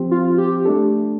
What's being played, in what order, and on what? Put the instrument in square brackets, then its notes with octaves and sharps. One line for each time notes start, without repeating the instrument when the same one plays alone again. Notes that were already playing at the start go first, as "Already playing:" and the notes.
Already playing: [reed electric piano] F3 C4 G4 C5
[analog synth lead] F4
G4
[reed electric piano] A3 D4 A4